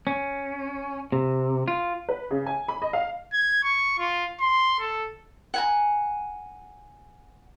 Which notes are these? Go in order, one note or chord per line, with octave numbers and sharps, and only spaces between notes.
C#4
C3
F4
B4
C#3
G#5
B5
D#5
F5
G#6
C#6
F4
C6
A4
F#5 G#5 A#5